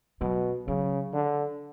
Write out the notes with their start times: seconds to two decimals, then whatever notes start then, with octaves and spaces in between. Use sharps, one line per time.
0.21 B2 F#3
0.67 C#3 F#3
1.13 D3